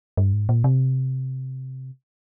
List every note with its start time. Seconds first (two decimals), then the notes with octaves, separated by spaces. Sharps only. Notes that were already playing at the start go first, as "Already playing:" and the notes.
0.17 G2
0.33 G#2
0.49 A#2
0.64 C3